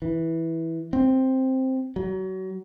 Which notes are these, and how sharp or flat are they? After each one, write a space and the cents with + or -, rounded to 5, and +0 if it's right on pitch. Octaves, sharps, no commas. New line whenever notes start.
E3 -10
C4 +5
F#3 +30